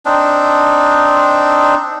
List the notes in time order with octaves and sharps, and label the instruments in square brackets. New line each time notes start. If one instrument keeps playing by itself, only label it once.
[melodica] C4 D4 D#4